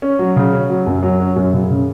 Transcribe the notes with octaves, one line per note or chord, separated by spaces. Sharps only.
C#4
F#3
C#3
C#4
F#3
F#2
F#3
C#4
F#2
C#3
C#3